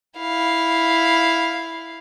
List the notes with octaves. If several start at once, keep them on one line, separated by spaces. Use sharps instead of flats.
E4 F5